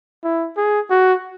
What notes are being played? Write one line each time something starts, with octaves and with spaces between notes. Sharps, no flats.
E4
G#4
F#4